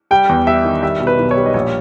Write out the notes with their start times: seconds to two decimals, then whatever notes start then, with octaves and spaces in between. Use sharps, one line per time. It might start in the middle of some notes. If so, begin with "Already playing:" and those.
0.11 G3 G5
0.29 E2
0.47 G3 E5
0.65 D#3
0.83 G3 E5
1.00 B2
1.07 B4
1.19 B1
1.31 C#5
1.36 G3
1.46 D#5
1.54 A#1 C#5